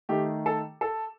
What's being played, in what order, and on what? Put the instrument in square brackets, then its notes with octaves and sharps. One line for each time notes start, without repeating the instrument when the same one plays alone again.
[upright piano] D#3 A3 D#4 G4
A4
A4